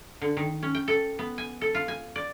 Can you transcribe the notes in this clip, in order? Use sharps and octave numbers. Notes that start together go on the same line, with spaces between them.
D3
D#3
C#4
G5
A4
B3
G#5
A4
F4
G#5
D5